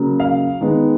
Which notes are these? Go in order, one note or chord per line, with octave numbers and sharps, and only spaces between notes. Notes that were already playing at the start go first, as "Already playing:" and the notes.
Already playing: C#3 F#3 A#3
F5
D#3 G#3 B3